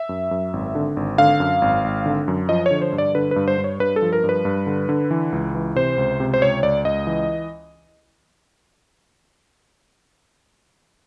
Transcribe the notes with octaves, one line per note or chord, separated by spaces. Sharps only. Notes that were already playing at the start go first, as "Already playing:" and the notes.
Already playing: E5
F#2
F#2
G#1
D3
G#1
D3 F5
F#2
G#1
G#1
D3
F#2
F3 D#5
D3 C#5
C5
G2
D5
D3 B4
G2 B4
C5
G2
C#5
G2 B4
A4
F3
A#4
G2
B4
G2
D3
D3
E3
C#2
E3
C3 C5
C#2
C3
C5
C#2 C#5
C#2 D5
C#2 D#5
E3